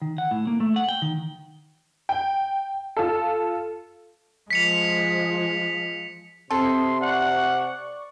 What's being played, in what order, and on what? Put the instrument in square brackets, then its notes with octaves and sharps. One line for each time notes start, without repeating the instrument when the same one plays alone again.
[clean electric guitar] D#3
F#5
A2
A#3
A3
F#5
G5
D#3
[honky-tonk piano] G5
F4 A4
[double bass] F3 G#3 [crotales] B6 C#7 F7
[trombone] C3 [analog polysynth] C4 D#6 [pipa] A4 [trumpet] C6
[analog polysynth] D5 C#6 [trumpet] F#5